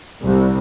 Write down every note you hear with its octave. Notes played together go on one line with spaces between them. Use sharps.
C2